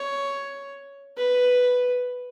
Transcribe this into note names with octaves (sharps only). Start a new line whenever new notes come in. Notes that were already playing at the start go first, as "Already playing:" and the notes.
Already playing: C#5
B4